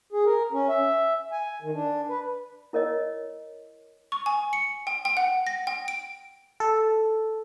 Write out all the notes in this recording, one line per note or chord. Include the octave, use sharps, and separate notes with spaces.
G#4
A#4
C#4
E5
G#5
D#3
D4
B4
E4 A#4 C#5 D#5
C#6
G#5
C#7
G5
G5
F#5
A#6
G5
D7
A4